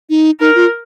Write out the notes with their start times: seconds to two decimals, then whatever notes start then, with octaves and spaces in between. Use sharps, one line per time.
0.10 D#4
0.40 D#4 A#4
0.55 F4